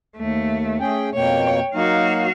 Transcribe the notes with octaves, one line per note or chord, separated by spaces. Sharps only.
D#2 A3
C#4 G#4 G5
F2 B2 A#3 C#5 G5
F#3 A#3 D#4 F#4 F5